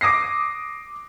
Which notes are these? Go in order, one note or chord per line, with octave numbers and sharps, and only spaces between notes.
D6 D#6 A#6 C7